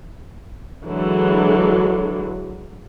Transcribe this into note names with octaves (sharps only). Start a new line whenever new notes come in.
D3 E3 F#3 G#3 A4